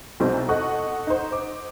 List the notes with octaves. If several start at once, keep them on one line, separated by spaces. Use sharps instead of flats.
C2 B2 C4 D#4
A4 D#5 F#5 C#6 F#6
D#4 C5
D6